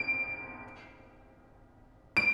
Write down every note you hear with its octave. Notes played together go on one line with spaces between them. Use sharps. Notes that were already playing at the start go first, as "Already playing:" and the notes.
Already playing: D7
D7